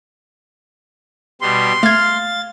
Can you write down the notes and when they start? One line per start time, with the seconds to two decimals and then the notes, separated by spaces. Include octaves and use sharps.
1.41 B2 G3 C6
1.83 A3 F5 G#6 A6